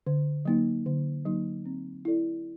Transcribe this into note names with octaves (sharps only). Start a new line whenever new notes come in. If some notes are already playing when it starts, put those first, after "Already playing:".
D3
F#3 A#3 D#4
D3
F#3 A#3 D#4
C4
E4 A4 D5